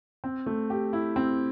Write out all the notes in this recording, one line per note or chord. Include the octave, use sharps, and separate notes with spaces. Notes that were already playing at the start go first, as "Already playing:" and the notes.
C4
A3
G4
E4
C4